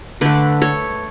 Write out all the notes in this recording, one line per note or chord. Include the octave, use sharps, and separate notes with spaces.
D3 A3 B4 D5
A4 C#5